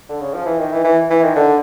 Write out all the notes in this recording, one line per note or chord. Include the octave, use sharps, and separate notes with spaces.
D3
C#3
F3
E3
D#3
E3
E3
E3
D#3
D3